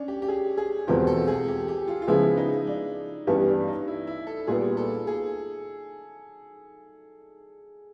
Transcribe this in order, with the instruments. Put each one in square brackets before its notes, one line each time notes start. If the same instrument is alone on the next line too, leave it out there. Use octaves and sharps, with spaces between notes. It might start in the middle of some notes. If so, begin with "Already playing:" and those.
Already playing: [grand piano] C#4 D4
G4
G4
G#4
G#4
[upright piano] E2 B2 G#3 C4 F4 [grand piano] G4
[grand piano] A4
G#4
G4
G4
F4
F4
[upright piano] C#3 F3 G#3 B3 [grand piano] E4
[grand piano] D#4
D4
[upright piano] G2 E3 G3 B3 [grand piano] C#4
[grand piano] D4
D#4
E4
E4
A4
[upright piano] A#2 G3 B3 [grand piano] G#4
[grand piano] A4
G#4